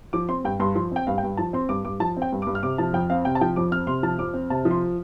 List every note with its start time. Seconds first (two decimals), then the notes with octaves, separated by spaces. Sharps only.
0.13 F3 D6
0.28 C4 C6
0.44 G2 G5
0.60 G2 C6
0.75 F3 C6
0.91 C4 G5
1.07 G2 F5
1.18 G5
1.23 G2
1.37 F3 A5
1.53 C4 C6
1.69 G2 D6
1.85 G2 D6
2.00 F3 A5
2.17 C4
2.22 G5
2.32 G2
2.42 D6
2.47 G2
2.55 F6
2.63 C3 D6
2.78 F3 A5
2.93 F2 G5
3.10 C4 F5
3.25 C3 G5
3.35 A5
3.41 F3 G5
3.56 F2 D6
3.71 C4 F6
3.87 C3 C6
4.03 F3 A5
4.18 F2 D6
4.34 C4
4.50 C3 A5
4.65 F3
4.71 C6